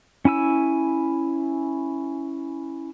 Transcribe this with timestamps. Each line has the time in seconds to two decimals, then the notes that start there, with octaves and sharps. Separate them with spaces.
0.25 C#4 E4 G#5 E6